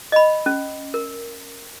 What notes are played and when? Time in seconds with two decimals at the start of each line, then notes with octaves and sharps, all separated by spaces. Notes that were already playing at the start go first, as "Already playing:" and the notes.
0.12 D#5 B5
0.46 C#4
0.94 A#4